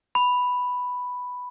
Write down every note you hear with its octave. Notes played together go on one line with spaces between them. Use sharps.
B5